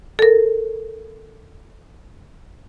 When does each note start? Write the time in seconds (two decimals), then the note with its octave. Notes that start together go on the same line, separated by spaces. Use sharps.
0.19 A4 A#4